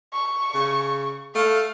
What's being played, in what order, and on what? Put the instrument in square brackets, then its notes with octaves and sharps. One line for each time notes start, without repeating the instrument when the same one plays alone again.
[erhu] C#6
[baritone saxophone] C#3
[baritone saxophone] A3 [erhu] F5